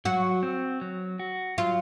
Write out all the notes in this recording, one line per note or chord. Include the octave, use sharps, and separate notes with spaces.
F#3 F#4
C4
F#3
F#4
F#3 F4